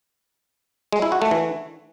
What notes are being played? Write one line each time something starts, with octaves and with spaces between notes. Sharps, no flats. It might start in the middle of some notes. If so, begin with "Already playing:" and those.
G#3
E4
F#4
A3
E3